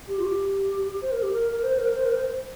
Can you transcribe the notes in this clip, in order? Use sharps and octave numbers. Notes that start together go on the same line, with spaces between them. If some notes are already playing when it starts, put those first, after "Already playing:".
G4
F4
G4
C5
A#4
G4
A#4
A#4
C5
A#4
C5
A#4
C5